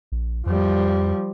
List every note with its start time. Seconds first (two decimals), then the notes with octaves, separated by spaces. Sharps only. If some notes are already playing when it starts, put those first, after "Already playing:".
0.12 A#1
0.46 F2 F3 G3